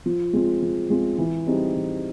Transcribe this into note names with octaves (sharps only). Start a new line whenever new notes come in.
F3
G#3 C4 F4
F3
G#3 C4 F4
E3
G3 C4 D#4 G#4
E3